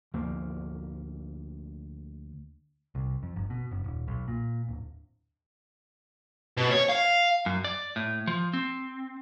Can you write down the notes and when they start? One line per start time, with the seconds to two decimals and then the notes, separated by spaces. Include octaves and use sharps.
0.14 D2 F3 A#3
2.95 C2
3.23 F2
3.36 G1
3.50 B2
3.71 F#1
3.84 D#1
4.08 B1
4.28 A#2
4.69 D1
6.57 B2
6.71 C#5
6.90 F5
7.46 F#2
7.65 D5
7.96 A2
8.27 F3
8.53 C4